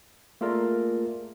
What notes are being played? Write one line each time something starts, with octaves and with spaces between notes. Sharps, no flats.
A3 A#3 F4 G#4 A#4 D5